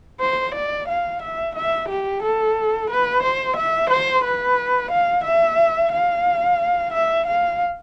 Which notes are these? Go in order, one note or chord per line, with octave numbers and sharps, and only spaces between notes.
C5
D5
F5
E5
E5
G4
A4
B4
C5
E5
C5
B4
F5
E5
F5
E5
F5